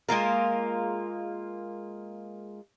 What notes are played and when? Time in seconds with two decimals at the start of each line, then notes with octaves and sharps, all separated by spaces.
0.08 G#3 A#3 F4 A#4